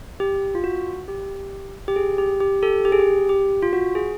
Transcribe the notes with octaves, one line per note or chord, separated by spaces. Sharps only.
G4
F4
F#4
G4
G4
G#4
G4
G4
G4 A4
G4
G#4
G4
G4
F4
F#4
G#4